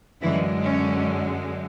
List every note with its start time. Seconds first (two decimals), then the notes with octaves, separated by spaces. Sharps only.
0.22 F#2 D3 E3 G#3 E4
0.63 C#4